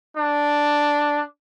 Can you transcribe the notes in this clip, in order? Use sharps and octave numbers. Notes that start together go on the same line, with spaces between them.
D4